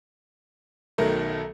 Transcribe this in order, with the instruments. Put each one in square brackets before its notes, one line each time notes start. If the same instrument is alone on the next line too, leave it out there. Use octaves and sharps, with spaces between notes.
[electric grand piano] B1 D#3 F#3 [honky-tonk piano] A3 A#4